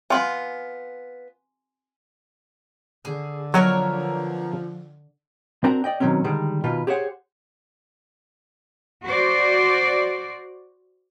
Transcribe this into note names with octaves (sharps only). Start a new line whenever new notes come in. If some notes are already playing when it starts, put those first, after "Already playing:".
B3 F4 G#5 C6
D3 G#4
F3 F#3 B3 F#4 A#4 C#5 D#5
C4 D4 F#4 A#4 A#5
D5 D#5 G5
B2 D#3 F#3 C4 C#4
D3 D#3 G3 G#3
B2 D#3 F4 B4
G4 G#4 C5 C#5 F#5
F#4 C5 D5